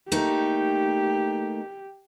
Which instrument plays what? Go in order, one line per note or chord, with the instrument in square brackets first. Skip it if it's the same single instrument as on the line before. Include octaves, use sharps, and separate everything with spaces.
[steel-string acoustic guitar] A3 A#3 D#4 [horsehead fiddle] G4